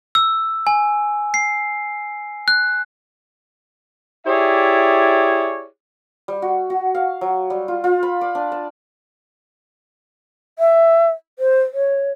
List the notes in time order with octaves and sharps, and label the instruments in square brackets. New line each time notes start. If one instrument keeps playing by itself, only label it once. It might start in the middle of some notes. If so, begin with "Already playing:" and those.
[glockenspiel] E6
G#5
C7
F#6
[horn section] E4 G4 G#4 C#5 D5 E5
[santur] G3
F#4
F#4
F5
F#3
G3
F4
F4
B5
D5
D4
A5
[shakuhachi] E5
C5
C#5